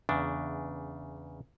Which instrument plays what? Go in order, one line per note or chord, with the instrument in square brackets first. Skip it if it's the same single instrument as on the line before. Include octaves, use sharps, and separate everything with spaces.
[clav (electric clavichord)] E2 C#3 D4